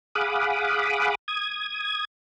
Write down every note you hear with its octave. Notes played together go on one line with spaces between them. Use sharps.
G#4 F5 F#5 B5 D6 D#6
D#6 G#6